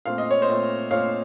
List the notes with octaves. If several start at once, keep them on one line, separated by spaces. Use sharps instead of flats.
A#2 A3 C4 F5
D#5
C#5
C5 D#5
A#2 A3 C4
A#2 A3 C4 C#5 F5